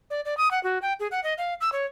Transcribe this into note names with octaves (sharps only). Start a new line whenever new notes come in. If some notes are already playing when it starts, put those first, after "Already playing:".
D5
D5
D#6
F#5
F#4
G5
G#4
F#5
D#5
F5
E6
C#5